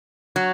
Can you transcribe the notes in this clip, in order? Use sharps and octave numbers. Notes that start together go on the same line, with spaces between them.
F#3